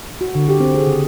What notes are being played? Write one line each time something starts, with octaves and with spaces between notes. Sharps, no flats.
F#4
D3
G4
C4
G#4
C#3